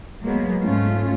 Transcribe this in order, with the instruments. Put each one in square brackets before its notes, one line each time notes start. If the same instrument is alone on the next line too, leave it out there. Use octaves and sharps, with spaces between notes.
[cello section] F#3 G#3 A#3 B3
G#2 A3 C#4 F4